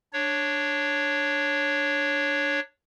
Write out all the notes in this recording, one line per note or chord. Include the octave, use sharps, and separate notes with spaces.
D4 C#5